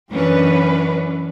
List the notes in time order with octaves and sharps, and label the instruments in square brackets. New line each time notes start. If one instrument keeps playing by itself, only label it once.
[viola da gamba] F#2 E3 [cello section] C#4 D4 B4